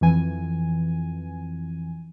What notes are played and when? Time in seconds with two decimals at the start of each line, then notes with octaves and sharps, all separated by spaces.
0.01 F2 E3 G#5